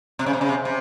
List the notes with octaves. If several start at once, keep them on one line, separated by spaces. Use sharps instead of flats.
C3
C#3
C3
C#3
C3
C3